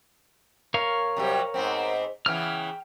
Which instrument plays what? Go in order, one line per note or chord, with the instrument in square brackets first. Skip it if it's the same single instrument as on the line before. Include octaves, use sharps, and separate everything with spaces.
[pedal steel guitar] A#4 C#5 F5
[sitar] C3 F#3 G3
G#2 B3 C4
[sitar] C#3 E3 B3 [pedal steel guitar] G5 F6